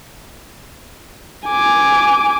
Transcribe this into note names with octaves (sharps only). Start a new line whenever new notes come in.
G#5 D6